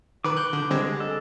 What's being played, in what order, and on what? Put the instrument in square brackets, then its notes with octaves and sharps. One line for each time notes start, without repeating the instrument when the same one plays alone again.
[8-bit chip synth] D#3 B4 [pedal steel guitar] D6
[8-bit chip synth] F#6 G6
D3
[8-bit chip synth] D3 G3 C4 [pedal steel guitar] G#3
[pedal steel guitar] A4